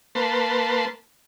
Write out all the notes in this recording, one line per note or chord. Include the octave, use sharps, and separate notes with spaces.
A#3 B4 A5 C6